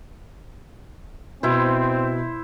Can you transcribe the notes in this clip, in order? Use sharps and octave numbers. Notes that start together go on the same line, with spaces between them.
B2 C4 E4 C5